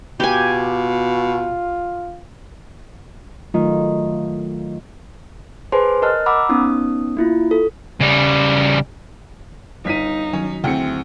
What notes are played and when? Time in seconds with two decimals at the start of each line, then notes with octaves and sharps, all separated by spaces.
0.20 B2 F4 G4 G#5
3.54 D#3 F#3 A3 F4
5.72 G#4 B4 C5 G#5 A5 C6
6.02 A#4 D#5 A5 F6 F#6
6.26 F#5 A#5 B5 D6 E6
6.49 B3 C#4 D#4 D#6
7.17 A#3 E4 F4
7.51 A4
8.01 C#3 G3
9.85 G1 D#4 B6 D#7
10.33 D#3 F#3 C#4
10.64 D2 C4 E4 G#4 G5 C#7